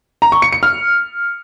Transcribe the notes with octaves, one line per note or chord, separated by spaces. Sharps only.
A#5
C#6
C#7
C#7
F6